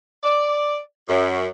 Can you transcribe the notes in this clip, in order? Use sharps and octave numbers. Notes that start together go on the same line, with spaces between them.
D5
F#2